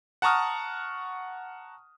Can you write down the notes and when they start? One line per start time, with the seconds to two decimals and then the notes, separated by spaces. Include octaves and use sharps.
0.22 F#5 A5 A#5 C#6 D#6 F6